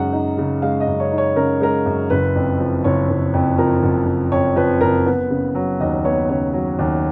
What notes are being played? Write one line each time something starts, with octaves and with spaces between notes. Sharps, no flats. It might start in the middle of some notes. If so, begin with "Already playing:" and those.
Already playing: F#2 C#3 G#3 D#4 F#5
D#4
C#3
G#3 F5
D#5
F#2
C#5
D#4
C#5
C#3 A#4
G#3 A#4
F#2
F#1 B4
F2
F3
F#1 C#5
F#1
F2
F3 A#4
F#1
F#1
F2 C#5
F3 B4
F#1 A#4
B3 B4
C#3
F#3
D#2 D#5
B3 C#5
C#3 C#5
F#3
D#2